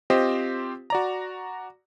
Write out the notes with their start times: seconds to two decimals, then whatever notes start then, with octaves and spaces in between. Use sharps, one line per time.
0.10 C4 F4 G4 C5 D#5
0.90 F#4 D5 A#5